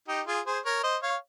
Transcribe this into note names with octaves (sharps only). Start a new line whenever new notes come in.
D#4 G4
F4 G#4
G#4 C5
A#4 C#5
C5 D#5
C#5 F5